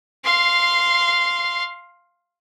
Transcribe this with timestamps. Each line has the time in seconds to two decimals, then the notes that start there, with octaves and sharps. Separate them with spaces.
0.24 F5 C6